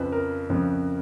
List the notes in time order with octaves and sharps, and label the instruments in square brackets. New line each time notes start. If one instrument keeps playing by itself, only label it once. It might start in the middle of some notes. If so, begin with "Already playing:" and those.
Already playing: [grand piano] F2 C#3 F3 B4
A#4
F2 C#3 F3